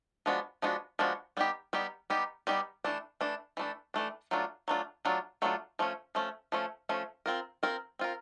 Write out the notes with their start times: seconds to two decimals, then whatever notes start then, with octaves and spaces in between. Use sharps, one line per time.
0.26 F3 G#3 B3 D4 F#4
0.62 F3 G#3 B3 D4 F#4
0.99 F3 G#3 B3 D4 F#4
1.37 G3 B3 D#4 G4
1.73 G3 B3 D#4 G4
2.10 G3 B3 D#4 G4
2.47 G3 B3 D#4 G4
2.84 E3 A3 D4
3.21 E3 A3 D4
3.57 E3 A3 D4
3.94 E3 A3 D4
4.31 F#3 A3 D4 F4
4.68 F#3 A3 D4 F4
5.05 F#3 A3 D4 F4
5.42 F#3 A3 D4 F4
5.79 F3 A3 C#4
6.15 F3 A3 C#4
6.52 F3 A3 C#4
6.89 F3 A3 C#4
7.26 C4 F4 A#4
7.63 C4 F4 A#4
7.99 C4 F4 A#4